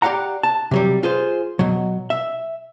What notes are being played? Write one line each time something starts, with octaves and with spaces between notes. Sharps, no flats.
G4 D5 F5 F#5 A#5
A5
C3 F#3 G3
F4 G#4 C5
B2 F#3
E5